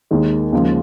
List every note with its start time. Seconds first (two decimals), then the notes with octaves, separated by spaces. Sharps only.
0.11 D#2 D#3 G#3
0.52 D#2 C#3 F3 G#3